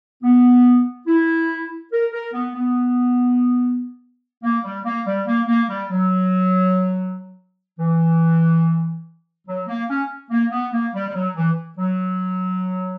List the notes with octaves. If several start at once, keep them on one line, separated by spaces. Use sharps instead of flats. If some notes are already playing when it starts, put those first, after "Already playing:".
B3
E4
A#4
A#4
B3
B3
A#3
G3
A#3
G3
A#3
A#3
G3
F#3
E3
F#3
A#3
C#4
A#3
B3
A#3
G3
G3
F#3
E3
F#3